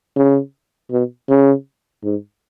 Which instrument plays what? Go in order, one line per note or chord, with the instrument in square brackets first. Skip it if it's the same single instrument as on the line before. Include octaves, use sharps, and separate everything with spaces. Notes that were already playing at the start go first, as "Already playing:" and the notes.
[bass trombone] C#3
B2
C#3
G#2